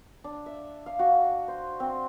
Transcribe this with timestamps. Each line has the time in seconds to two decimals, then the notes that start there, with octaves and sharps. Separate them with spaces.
0.24 D4
0.46 E5
0.86 F5
0.99 F#4
1.48 C5
1.80 C4